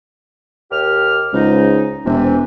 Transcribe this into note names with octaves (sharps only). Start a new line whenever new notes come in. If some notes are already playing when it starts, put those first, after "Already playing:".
D#2 G4 F6
C#2 G#2 D#4
E1 C3 E3